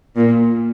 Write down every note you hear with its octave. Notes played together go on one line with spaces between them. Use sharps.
A#2